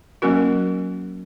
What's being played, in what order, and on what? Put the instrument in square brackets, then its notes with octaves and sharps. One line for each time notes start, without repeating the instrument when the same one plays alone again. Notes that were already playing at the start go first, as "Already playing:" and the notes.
[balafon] F#3 A#3 C#4 F#4 A#4